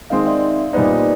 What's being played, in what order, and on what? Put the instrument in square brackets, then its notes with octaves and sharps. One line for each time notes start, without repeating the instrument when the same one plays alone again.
[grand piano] D#3 G#3 C4 [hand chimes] D#5 F5
[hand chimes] D5 E5
[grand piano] A#2 G3 B3 D#4 [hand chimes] C5 D5
[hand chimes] D5